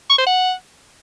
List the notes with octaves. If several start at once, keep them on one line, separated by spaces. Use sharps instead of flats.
C#6
C5
F#5